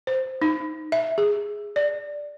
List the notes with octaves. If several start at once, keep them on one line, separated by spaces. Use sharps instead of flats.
C5
D#4
E5
G#4
D5